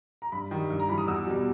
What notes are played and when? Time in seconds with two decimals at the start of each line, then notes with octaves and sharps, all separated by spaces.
0.22 A#5
0.32 G2 B5
0.51 D#3 G3
0.70 G2
0.80 A#5
0.89 E3 G3 B5
0.98 D#6
1.07 E2 E6
1.27 B2 G3